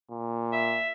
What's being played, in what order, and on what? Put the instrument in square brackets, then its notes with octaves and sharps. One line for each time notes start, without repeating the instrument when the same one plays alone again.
[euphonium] A#2
[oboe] E5